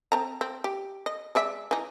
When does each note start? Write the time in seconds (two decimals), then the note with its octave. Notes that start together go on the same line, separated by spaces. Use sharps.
0.12 C4 A5 A#5
0.41 C4
0.64 G4
1.06 D#5
1.35 G#3 D5 E5
1.71 E3 D#4